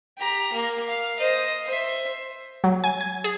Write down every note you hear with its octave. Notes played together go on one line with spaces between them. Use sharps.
G4 A#5
A#3
F5
C5 D#5
C5 E5
F#3
G#5
G#6
G#4